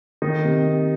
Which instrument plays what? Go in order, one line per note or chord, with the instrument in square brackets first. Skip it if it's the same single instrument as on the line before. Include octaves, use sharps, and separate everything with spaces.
[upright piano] D#3 D#4
C3
C3